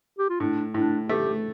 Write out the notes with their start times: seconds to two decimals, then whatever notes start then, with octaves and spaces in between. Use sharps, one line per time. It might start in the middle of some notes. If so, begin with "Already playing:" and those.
0.19 G4
0.30 F4
0.40 A2 D4
0.74 A2 D4
1.08 A3 G4